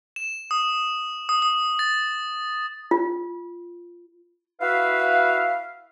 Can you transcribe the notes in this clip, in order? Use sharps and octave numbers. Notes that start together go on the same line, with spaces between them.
E7
D#6
D#6
D#6
A6
F4
E4 F#4 B4 E5 F5